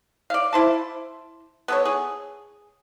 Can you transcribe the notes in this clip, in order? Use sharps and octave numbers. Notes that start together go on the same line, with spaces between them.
D5 F5
E4 C5 A5
B3 A4 C#5
G#4